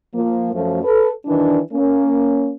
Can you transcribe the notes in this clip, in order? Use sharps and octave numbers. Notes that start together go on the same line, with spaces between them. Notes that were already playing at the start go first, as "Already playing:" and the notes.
F3 A#3
F#2 F3 A3
A4 B4
D#3 E3 G3 D4
A#3 C#4